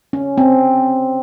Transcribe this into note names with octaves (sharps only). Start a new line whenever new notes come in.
C#4
C4